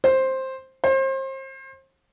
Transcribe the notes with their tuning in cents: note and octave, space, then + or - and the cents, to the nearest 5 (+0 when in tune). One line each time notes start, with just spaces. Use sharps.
C5 +10
C5 +35